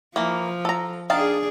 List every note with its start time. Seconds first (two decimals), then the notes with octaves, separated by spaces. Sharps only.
0.16 E3 F3 A#3
0.65 A4 A#5
1.10 D#3 D4 G#4 F5 A5